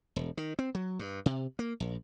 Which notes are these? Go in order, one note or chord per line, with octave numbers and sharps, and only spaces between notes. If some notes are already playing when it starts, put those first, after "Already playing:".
E1
D#3
C4
F#3
G2
C3
A#3
A#1